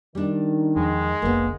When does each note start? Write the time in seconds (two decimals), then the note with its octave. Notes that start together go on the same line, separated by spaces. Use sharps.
0.15 D#3 G3 D4
0.76 E2 F3 G#3
1.22 F1 A#1 D3 A#3 B3